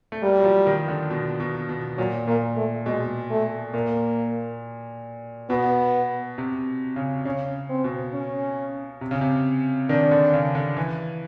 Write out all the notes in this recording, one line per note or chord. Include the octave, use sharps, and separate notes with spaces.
A3
G3 A#3
F#3
F3
D#3
D3
B2
B2
B2
A#2 F#3
A#2 A#3
A3
B2 G#3
A3
A#2 A#3
B2 B3
C3
C#3
C#3 C#4
C4
B2
C#4
C3
C#3
C3
D#3 D4
D3
C#3
D3
E3